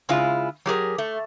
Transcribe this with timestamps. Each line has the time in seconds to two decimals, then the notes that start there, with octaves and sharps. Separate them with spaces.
0.09 C#3 G#3 E4 F4
0.66 F#3 G4 G#4 A#4
0.98 A3